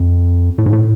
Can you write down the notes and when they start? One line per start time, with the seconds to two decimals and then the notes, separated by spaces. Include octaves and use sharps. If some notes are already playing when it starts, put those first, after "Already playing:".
Already playing: F2
0.58 A2
0.66 G#2
0.73 A2